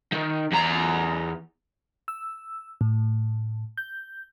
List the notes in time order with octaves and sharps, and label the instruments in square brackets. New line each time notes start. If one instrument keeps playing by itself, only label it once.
[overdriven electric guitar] D#3
E2 A#5
[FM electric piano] E6
A2
G6